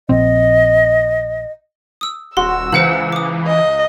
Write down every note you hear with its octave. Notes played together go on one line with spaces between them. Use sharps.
A#1 C4 D#5
D#6 E6
D#1 F#4 C6 E6
C#2 E3 C5 F#5 C#7 F#7
D6 D#6
D#5